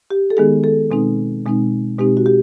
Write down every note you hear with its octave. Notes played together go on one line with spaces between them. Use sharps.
G4
A4
D#3 G#3 B3 D#4 G#4
A4
B2 G#3 C4 D#4
B2 G#3 C4 D#4
B2 G#3 C4 D#4 G4
F#4
G4